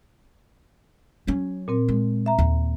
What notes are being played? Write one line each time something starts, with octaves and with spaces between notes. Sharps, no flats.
F#3 C#4
A#2 C4 A#4
G#3
E5 A#5
D#2